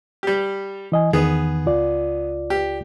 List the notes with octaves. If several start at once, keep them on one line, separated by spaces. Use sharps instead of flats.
G3 G4
E3 D#5 G#5
E2 D#3 B3 G#4
C#2 F4 D5
G4